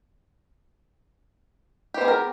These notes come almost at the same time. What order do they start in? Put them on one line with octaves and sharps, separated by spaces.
G4 C5 B3 G#4 A#4